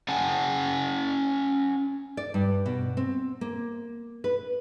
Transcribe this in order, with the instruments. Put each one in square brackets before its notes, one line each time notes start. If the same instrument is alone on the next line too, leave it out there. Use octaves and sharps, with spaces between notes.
[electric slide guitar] C#4 F#5 G#5 A5
[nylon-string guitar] D5
G2
B2
C4
A#3
B4